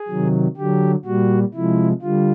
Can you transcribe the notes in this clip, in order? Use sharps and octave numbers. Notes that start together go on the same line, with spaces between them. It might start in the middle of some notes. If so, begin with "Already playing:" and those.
Already playing: G#4
C3 D#3 F#3
D3 F#3 G4
A#2 G3 F#4
C3 F3 G#3 E4
D3 G3 F4